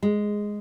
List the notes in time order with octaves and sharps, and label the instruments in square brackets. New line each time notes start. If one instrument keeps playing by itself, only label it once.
[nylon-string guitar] G#3